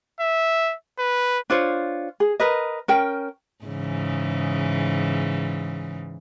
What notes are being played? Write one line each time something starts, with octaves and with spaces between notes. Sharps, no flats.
E5
B4
D4 F4 C5 C#5
G#4
A#4 B4 D#5
C#4 A#4 G5
G#2 C#3 E3